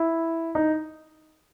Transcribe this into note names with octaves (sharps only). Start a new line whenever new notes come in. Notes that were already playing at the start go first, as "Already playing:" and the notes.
Already playing: E4
D#4